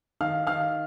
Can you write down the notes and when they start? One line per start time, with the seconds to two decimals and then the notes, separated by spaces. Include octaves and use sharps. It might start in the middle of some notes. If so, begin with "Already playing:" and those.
0.21 D#3 F5 F6
0.47 D#3 F5 F6